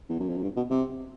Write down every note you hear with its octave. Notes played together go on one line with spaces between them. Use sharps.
E2
F#2
F2
F#2
G2
B2
C3